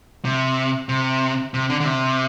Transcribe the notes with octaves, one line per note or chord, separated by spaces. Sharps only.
C3
C3
C3
D3
D3
C3